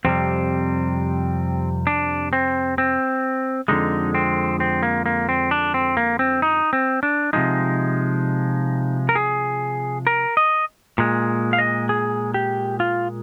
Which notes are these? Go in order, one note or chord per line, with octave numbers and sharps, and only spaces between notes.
F2 C3 G3 C4
D4
C4
C4
F2 D3 G#3 D#4
C4
C4
A#3
A#3
C4
D4
C4
A#3
C4
D#4
C4
D4
C3 F3 G#3 D#4
A#4
G#4
A#4
D#5
A#2 G#3
F5
D#5
G#4
G4
F4